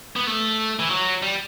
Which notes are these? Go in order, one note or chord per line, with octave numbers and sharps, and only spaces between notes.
B3
A3
E3
F#3
G3